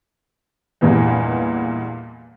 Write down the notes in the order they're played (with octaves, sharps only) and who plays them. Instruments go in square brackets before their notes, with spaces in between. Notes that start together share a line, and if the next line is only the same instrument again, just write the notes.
[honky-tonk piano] E2 G2 A#2 E3 G3 G#3